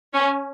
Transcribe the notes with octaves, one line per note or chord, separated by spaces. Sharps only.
C#4